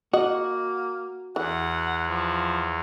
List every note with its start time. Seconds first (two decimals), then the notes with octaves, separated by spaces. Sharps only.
0.13 A#3 F#4 D#5
1.36 E2 E3 F#5
2.09 F3